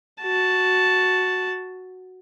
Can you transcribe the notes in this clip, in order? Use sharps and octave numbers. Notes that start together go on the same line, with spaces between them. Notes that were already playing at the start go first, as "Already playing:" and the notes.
F#4 A5